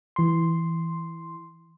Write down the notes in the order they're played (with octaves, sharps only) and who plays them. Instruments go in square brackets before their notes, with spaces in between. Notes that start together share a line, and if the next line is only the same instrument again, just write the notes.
[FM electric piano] E3 C6